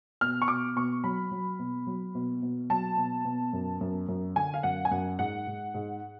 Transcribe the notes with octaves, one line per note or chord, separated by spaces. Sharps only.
B2 F6
C#6
B2 D6
B2 C#6
F#3 B5
F#3
B2
F#3
B2
B2
F#3 A5
B2
B2
F#2
F#2
F#2
D3 G#5
F5
F#2 F#5
G#5
F#2 F#5
G#2 F#5
G#2
G#2